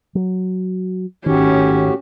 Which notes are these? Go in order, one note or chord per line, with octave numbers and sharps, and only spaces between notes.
F#3
G#1 A2 D#3 C#4 F#4 G4